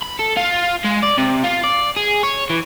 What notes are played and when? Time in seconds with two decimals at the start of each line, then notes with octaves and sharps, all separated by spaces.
0.03 B5
0.19 A4
0.37 F4
0.84 G#3
1.02 D5
1.18 C3
1.44 F4
1.64 D5
1.96 G#4
2.23 C#5
2.50 E3